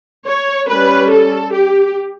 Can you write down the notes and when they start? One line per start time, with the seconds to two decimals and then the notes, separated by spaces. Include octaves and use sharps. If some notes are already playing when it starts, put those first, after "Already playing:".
0.25 C#5
0.68 G3 C#4 B4
1.11 A4
1.53 G4